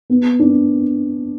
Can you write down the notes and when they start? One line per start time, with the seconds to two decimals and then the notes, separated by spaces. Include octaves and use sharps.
0.10 B3
0.40 D4